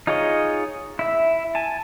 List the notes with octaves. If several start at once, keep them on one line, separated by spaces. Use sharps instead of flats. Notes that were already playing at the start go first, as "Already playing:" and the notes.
D#4 F4 G#4 C#5 D#5
E4 E5
G#5 A5